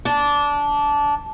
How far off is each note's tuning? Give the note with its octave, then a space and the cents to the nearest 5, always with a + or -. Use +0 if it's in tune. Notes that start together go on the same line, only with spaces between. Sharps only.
D4 -15